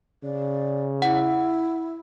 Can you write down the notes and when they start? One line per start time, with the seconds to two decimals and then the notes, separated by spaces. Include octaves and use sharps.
0.24 C#3 D5
1.02 E4 F#5